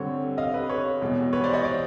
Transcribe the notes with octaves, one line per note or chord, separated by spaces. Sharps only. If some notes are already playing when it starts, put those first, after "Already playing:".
Already playing: G2 D3 G3 C4 C#5
D#5 F5
B4
B4 C#5
E1 E2 B2 G3
B4 C#5
C5 D5
C#5 D#5
C5 D5